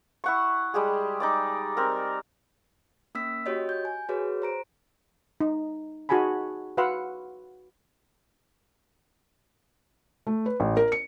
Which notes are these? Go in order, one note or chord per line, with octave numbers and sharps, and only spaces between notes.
E4 F#5 C#6
G3 G#3 G4 G#4
D#4 D5 D6
C4 A#4
A#3 C#4 E6 B6
F#4 G4 C#5 D#5
G6
G#5
F#4 G#4 B4 C#5
C5 A#5 D7
D#4
D#4 F#4 G#4 G#5 A5 B5
F#4 B4 F5 F#5 C6 E6
A3
B4
A1
A#4
C#7